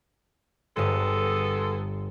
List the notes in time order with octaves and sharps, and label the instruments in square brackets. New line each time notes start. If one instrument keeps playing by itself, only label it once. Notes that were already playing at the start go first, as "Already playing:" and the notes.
[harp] G1 G2 [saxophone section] G#3 B3 A4